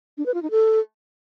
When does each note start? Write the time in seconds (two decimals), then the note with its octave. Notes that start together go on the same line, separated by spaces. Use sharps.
0.18 D4
0.26 B4
0.34 F4
0.42 D#4
0.51 A4